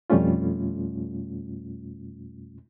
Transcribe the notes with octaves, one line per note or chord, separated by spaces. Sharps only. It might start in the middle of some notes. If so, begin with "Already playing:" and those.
F2 B2 G3 A3 C#4 F4